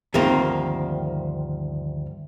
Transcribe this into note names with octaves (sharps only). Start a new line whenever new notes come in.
D2 G2 D#3 F3 A#3 C4